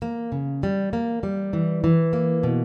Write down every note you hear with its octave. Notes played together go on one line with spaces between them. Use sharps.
A#3
C#3
G3
A#3
G3
E3
E3
A#3
B2